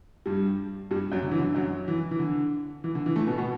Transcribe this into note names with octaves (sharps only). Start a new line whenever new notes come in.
G2 G3
G2 G3
F#2 F#3
D3
E3
D3
F#2 F#3
E3
E3
D3
E3
D3
E3
A2 A3
B2 B3
B2 B3